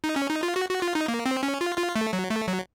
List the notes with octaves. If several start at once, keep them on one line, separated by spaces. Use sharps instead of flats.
D#4
C#4
D#4
F4
F#4
F#4
F4
D#4
A#3
C4
C#4
F4
F4
A3
F#3
A3
F#3